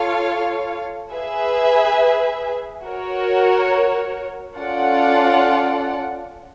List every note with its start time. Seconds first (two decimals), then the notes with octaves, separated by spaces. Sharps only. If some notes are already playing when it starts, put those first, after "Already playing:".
Already playing: F4 A4 C#5 F5
1.12 G#4 B4 E5
2.84 F#4 A#4 C#5
4.56 C#4 F4 A4 D5 F#5